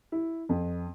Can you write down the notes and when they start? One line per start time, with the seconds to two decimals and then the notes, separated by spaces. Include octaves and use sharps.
0.12 E4
0.49 F2